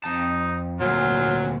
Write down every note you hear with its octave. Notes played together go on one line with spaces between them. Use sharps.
F2 D#4 A5
D2 A#2 F#3 F4